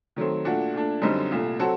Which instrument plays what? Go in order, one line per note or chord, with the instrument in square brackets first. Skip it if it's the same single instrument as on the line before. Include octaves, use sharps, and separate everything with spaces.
[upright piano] D#3 F#3 A3 C4
A#2 A3 D4 F#4
A#2 A3 D4
F#2 D3 G3 C4 D#4
C2 A#2 A3
F#3 C4 F#4 A4